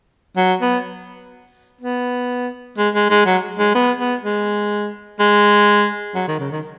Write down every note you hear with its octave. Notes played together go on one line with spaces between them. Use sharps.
F#3
B3
B3
G#3
G#3
G#3
F#3
G#3
B3
B3
G#3
G#3
F#3
D#3
C#3
D#3